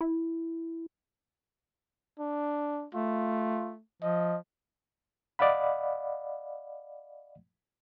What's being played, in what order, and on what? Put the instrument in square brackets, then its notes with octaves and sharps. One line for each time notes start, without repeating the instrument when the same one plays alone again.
[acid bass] E4
[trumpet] D4
[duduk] A3 [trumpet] F4
[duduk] F3 [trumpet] D#5
[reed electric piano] D5 D#5 F5 F#5 B5